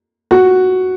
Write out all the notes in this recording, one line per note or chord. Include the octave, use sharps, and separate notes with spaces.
F#4